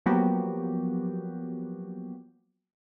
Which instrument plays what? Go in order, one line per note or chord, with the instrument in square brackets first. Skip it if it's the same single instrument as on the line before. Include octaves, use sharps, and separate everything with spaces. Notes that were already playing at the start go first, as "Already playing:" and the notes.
[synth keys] F3 F#3 A#3 B3 F#4 G4